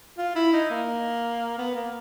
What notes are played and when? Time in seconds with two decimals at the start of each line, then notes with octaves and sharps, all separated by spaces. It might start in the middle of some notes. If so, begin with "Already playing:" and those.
0.18 F4
0.36 E4
0.53 D#4
0.71 A#3
1.58 B3
1.75 A#3